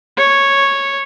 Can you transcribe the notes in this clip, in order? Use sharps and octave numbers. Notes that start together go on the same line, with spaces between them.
C#5